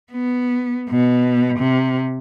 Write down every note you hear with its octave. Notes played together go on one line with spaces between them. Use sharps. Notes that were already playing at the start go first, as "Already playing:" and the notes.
B3
B2
C3